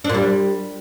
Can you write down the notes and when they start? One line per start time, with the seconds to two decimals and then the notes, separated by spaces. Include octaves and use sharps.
0.04 D4
0.09 A#2
0.14 G3